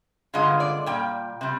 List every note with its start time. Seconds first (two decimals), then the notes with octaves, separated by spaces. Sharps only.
0.34 G2 D3 G#3 D4 F4 D#5
0.60 D5
0.86 A#2 G3 G5
1.41 C3 G3